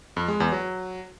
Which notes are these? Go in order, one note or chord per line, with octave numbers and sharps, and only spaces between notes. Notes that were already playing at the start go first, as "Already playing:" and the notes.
F2
G#3
E2
F#3